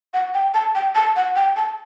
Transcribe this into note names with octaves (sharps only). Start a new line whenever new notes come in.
F#5
G5
A5
G5
A5
F#5
G5
A5